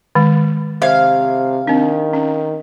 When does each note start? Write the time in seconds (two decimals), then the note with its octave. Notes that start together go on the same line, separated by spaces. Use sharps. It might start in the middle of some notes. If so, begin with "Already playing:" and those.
0.15 D#3 G#3
0.82 C3 C5 E5 F5
1.67 D#3 C4 D4
2.13 C#4